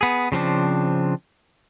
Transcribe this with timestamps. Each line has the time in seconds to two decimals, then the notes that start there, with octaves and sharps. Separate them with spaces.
0.01 B3 G#4
0.32 C#3 F3 C4 D4